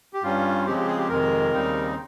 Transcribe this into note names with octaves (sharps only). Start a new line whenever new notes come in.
G4
G2 G3 C#4 F4
C#3 F3 G#3 C4 G4
G4
G#4
G4
F2 C3 D#3 G#3 A#4
D#2 C#3 G3 C4 D#4